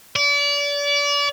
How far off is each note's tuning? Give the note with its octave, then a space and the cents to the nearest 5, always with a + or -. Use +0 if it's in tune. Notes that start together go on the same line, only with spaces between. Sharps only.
D5 -35